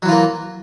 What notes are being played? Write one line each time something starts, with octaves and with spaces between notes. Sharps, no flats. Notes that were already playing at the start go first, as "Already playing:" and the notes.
E3 F#3 A#3 F4